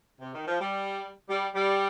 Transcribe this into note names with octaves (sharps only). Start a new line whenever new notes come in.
C3
D#3
F3
G3
G3
G3